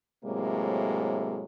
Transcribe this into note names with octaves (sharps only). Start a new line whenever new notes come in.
A2 C3 F#3 G#3 A#3